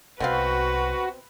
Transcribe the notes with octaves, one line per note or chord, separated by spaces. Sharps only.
C2 B2 C4 F#4 B4 F5